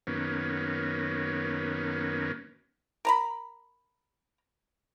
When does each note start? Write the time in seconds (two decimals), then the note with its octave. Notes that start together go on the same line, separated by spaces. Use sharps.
0.07 F#2 D#3 A#3 B3 C#4
3.05 A#4 A#5 B5